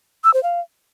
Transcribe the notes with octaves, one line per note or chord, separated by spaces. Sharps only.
E6
C5
F5